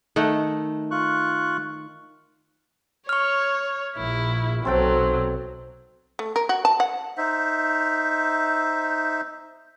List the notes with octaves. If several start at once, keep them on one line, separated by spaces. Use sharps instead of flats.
D#3 A3 F#5
F4 C#6 F#6
C#5 C#6 F6
A#1 E4
B1 F#3 C4 A4 G5
A3
A#4
F#4
A5
F#5
D#4 C5 E5